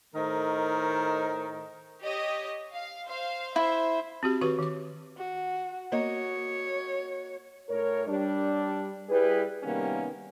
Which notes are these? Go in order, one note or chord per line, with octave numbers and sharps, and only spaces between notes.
A2 D#3 A3 A#4 C5 D#5
G4 C#5 D#5
F5
C5 F5
E4 C5 E5
C4 F#4 G4
D#3 F#4 G4 B4 C#6
D#3 D6
F#4
A#3 F#4 C#5 D#5
A2 A#4 C#5
G3 D4
G3 E4 G#4 B4
C3 D#3 G3 A#3 B3 C#4